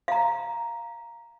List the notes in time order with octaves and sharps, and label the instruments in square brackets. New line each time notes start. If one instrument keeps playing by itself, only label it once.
[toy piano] F5 A#5